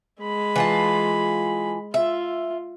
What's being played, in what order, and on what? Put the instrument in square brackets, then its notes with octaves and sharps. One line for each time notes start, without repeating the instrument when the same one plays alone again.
[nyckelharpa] G#3 B5
[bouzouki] E3 F4 A5
[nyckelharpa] F4 [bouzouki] E5